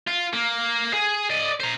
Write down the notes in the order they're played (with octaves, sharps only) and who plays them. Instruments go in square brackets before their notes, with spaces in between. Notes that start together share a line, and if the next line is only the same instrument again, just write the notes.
[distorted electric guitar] F4
A#3
G#4
D5 D#5
C5 A#5